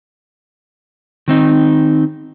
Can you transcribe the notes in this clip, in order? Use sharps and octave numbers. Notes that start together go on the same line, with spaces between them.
D#3 C4 D#4